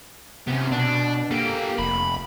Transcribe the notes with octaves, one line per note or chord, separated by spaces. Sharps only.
C3 B3 C#4
B2 D4
A#3 G4 A4
F1 B5